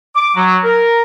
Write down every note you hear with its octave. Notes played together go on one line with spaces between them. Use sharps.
D6
F#3
A#4